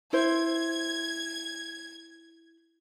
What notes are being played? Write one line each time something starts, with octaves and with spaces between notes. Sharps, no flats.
E4 C5 G#6